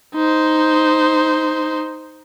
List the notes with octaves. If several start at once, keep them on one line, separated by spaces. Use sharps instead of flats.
D#4 C5